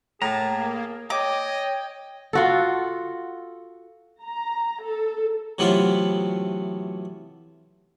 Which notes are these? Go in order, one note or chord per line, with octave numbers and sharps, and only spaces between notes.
A2 A#3 G#4 A5 A#5
C#5 D#5 G5 D6
F4 F#4 A4
A#5
A4
C3 E3 F#3 A3 B3 F4